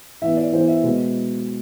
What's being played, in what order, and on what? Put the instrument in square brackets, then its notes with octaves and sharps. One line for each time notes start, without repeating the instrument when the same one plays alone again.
[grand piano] E3 B3 E5
D5
E3 C5
B3
E5
B2 G#3 B3